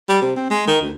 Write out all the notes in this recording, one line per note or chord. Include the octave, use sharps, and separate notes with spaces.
G3
C3
C4
G#3
D#3
D2